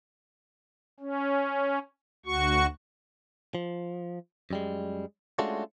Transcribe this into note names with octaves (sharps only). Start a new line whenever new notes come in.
C#4
D2 F#4 C#6
F3
F#2 G3 G#3
G#3 A3 C#4 D4 F4 F#4